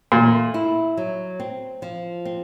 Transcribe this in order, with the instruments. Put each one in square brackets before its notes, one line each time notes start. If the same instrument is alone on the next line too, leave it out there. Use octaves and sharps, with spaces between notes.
[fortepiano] A#2 [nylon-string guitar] A3
[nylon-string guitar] E4
F#3
C4
F3
C4